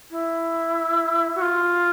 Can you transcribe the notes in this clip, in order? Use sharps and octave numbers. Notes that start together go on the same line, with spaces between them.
E4
F#4
F4